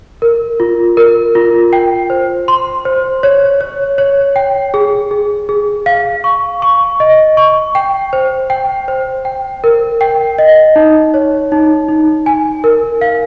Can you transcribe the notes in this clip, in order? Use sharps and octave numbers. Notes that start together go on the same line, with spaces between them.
A#4
F4
A#4
F4
G5
C5
C6
C5
C#5
C#5
C#5
G5
G#4
G#4
G#4
F5
C#6
C#6
D#5
C#6
G5
C5
G5
C5
G5
A#4
G5
D#5
D#4
C#5
D#4
D#4
G#5
A#4
F5